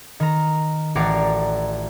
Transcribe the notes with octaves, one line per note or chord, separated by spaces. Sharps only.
D#3 A#5
A1 F#4 D5 A#5 C7